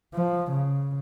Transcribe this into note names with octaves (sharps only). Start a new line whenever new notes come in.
F3
C#3